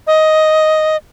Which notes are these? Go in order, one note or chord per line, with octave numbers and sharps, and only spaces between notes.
D#5